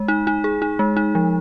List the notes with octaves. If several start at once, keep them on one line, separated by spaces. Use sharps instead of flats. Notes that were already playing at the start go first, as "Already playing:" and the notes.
Already playing: G#3
D#4
D#4
G#4
D#4
G#3
D#4
F3